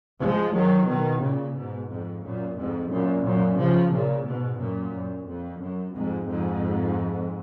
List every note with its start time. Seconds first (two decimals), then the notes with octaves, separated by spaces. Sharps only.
0.21 F3 G#3
0.55 D#3 F#3
0.88 B2 D#3
1.22 A#2 C#3
1.56 G#2 B2
1.90 F2 G#2
2.24 F#2 A#2
2.57 F2 G#2
2.92 F#2 A#2
3.25 F#2 A#2
3.58 C#3 F3
3.93 A#2 C#3
4.26 G#2 B2
4.60 F#2 A#2
4.94 F#2
5.28 F2
5.61 F#2
5.95 F2 G#2
6.29 F2 G#2